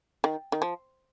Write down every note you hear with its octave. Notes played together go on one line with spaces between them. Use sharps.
D#3
D#3
F3